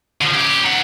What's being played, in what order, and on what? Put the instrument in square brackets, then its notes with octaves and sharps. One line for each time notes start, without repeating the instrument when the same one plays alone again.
[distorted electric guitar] D3 F3
C#4 G4
D#4 F#5